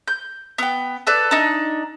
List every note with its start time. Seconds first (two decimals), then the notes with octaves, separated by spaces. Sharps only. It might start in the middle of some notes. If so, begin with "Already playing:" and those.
0.08 G6
0.58 B3 G5
1.07 A4 B4 D5
1.31 D4 D#4